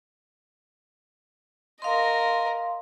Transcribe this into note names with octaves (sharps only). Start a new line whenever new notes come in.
A#4 D#5 F5 C6